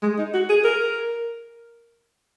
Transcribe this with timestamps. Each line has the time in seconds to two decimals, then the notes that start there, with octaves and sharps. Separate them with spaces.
0.03 G#3
0.18 D#4
0.34 F#4
0.50 G#4
0.64 A#4